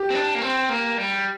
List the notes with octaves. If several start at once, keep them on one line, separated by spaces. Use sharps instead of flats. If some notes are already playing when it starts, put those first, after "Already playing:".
Already playing: G4
C4
D4
A#3
C4
A#3
G3